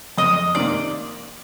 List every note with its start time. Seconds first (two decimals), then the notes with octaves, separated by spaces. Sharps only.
0.18 F2 D#5
0.55 C3 D#3 A#3 D5